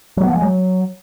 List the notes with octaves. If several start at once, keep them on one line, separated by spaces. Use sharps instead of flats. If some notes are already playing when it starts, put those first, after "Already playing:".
F#3
B3
F3
G#3
F#3